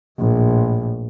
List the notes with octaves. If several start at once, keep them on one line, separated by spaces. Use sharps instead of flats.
A#1 A2